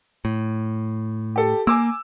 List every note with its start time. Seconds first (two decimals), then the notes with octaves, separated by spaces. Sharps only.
0.25 A2
1.36 G4 A4
1.67 A#3 G#5 D6 E6